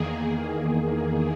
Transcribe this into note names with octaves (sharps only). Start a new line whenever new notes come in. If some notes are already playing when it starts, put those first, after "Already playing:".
Already playing: E2 D#3 A#3 G#4